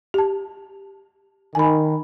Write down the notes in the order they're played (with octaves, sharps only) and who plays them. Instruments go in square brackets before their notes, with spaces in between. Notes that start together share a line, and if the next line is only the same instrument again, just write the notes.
[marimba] G4 A5
[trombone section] D#3 [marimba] G#5 B5